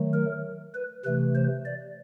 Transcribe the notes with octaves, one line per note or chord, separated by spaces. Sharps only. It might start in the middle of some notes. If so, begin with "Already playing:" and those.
Already playing: D#3 F#3 A3
A#4
B4
C3 E3 A3 B4
C5
D5